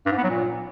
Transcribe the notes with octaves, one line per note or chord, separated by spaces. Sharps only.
G2
G#2
B3
F#3
A#2